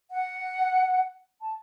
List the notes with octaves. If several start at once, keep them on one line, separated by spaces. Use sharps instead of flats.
F#5
A5